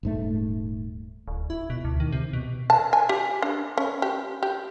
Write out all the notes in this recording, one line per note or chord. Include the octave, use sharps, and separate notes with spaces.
D#1 G#2 A3
D1
E4
B2
D2
D#3
C3
B2
A5
G#5
G4
D4
C#4
G4
G4